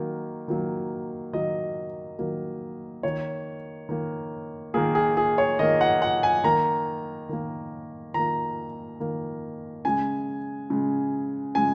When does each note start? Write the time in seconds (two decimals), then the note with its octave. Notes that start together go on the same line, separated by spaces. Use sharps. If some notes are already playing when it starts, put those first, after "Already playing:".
Already playing: D#3 F#3 A#3
0.48 D#3 F#3 A#3
1.33 D#3 F#3 A#3 D#5
2.19 D#3 F#3 A#3
3.03 D#3 A#3 C#5
3.89 D#3 A#3
4.74 D#3 A#3 G#4
4.95 G#4
5.17 G#4
5.38 C#5
5.59 D#3 D#5
5.62 A#3
5.81 F#5
6.02 F#5
6.23 G#5
6.44 D#3 A#3 A#5
7.29 D#3 A#3
8.14 D#3 A#3 A#5
9.00 D#3 A#3
9.85 C#3 G#3 G#5
10.70 C#3 G#3
11.55 C#3 G#3 G#5